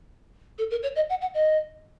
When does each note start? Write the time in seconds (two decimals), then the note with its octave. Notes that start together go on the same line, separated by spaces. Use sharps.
0.58 A4
0.71 A#4
0.83 C#5
0.96 D#5
1.10 F#5
1.21 F#5
1.34 D#5